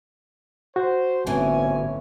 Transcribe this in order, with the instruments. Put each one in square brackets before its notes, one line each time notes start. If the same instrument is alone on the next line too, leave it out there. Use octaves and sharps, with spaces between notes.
[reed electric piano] F#4 [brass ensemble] C5
[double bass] G1 [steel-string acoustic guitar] A2 E3 C#4 [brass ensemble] C4 G#5